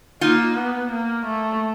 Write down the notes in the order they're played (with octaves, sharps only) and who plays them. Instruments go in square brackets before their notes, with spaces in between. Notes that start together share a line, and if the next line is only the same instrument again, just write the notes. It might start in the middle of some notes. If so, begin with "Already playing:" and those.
[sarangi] A#3 [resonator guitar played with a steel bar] D#4 F4
[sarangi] B3
A#3
A3